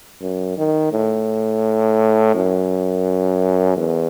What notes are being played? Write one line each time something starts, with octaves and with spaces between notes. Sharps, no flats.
F#2
D#3
A2
F#2
E2